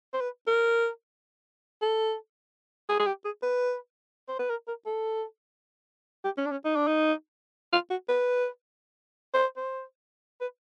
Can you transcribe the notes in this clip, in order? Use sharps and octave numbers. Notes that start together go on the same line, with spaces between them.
C5
B4
A#4
A4
G#4
G#4
G4
G#4
B4
C5
B4
A#4
A#4
A4
G4
C#4
D4
C#4
D#4
D4
D#4
F4
F#4
B4
C5
C5
B4